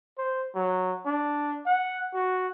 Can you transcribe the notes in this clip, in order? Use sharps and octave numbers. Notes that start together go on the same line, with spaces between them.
C5
F#3
D4
F#5
F#4